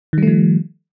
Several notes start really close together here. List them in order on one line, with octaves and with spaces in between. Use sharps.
D#3 G3 A3 F3